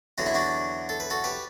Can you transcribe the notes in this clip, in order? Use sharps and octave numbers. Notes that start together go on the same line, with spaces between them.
E2 D3 F#3 F#4
E4
D4 F#4
A4
B4
F#4 A4
G4 B4